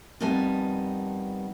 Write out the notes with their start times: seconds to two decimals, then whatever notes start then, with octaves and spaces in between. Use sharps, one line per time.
0.21 F2 D#3 G3 B3 G#5 A5